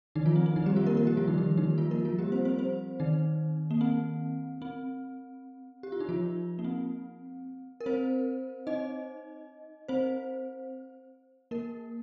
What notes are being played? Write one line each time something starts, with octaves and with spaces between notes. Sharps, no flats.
D#3 D#4
F3 F4
C4
C4
D#3 D#4
G3 G4
F3 F4
A#3 A#4
A#3 A#4
G3 G4
F3 F4
D#3 D#4
D#3 D#4
D#3 D#4
F3 F4
A#3 A#4
F3 F4
G3 G4
C4 C5
C4 C5
C4 C5
D#3 D#4
A#3
C4
C4
G4
F4
D#4
F3 F4
A#3
C4
A#4
C4 C5
D#4 D#5
C4 C5
A#3 A#4